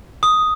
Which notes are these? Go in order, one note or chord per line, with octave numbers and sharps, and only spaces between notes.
D#6